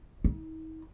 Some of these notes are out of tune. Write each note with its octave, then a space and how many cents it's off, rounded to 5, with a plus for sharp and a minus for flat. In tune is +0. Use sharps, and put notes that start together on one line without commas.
D#4 +45